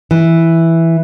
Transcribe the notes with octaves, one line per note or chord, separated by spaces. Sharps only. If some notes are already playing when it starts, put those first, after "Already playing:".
E3